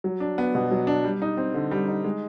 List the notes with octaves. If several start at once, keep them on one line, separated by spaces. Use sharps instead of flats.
F#3
D4
B3
B2
F#3
D4
G3
D#4
C4
D3
G3
D#4
G#3